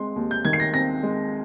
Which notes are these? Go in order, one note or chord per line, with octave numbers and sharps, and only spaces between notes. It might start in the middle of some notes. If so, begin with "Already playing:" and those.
Already playing: G#3 C4 C6
D#2
G6
D#3 G#6
C7
A#6
C4 A#6
G#3